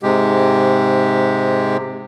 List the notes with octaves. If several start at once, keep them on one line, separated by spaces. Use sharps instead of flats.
G#2 C3 G#3 G4